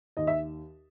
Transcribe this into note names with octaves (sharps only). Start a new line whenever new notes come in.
D#2 D#5
E5